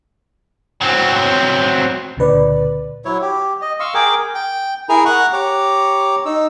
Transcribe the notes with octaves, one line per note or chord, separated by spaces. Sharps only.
F#3 C4
C#2 A#2 D3 B4 D5
F#3 E4 C#5
G4
D#5
F5 C6 C#6 E6
G#4 A#4 G5 D6
G5
E4 G#4 A#4 G#5 A#5
F#5 A#5 C#6 F#6
G4 C#5 A#5 D6
D#4 E6